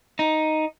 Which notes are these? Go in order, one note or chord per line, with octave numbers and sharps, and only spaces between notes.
D#4